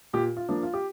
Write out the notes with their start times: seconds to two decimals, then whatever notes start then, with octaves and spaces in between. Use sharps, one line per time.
0.13 A#2 G4
0.37 F4
0.49 F3 A#3 D4
0.63 F4
0.74 G4